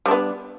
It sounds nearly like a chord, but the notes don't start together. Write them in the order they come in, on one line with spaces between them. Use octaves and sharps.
G3 D4 B3